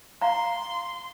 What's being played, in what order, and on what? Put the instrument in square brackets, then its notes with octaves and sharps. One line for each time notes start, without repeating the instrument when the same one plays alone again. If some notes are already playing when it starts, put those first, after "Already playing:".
[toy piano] F5 A#5 [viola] C6